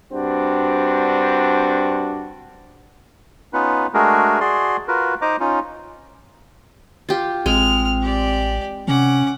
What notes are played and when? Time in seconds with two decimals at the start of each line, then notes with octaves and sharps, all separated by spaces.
0.12 G2 C4 D4 F#4
3.53 B3 C#4 D#4 F4 B4
3.94 G#3 A3 D4 F#4 G#4 A#4
4.41 F#4 G#4 D5 C6
4.88 F4 F#4 A#4 B4
5.22 D#4 C5 D#5 A#5 D6
5.40 C#4 D#4 F4
7.09 F4 G4
7.46 A1 G#3 C4 F6
8.01 G4 D5
8.88 C3 C#4 F#5 D6